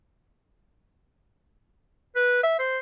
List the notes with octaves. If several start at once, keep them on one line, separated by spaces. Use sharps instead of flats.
B4
E5
C5